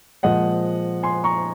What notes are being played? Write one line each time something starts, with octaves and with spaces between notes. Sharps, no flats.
A#2 F3 G#3 D#5 F#5
G#5 C6
A#5 C#6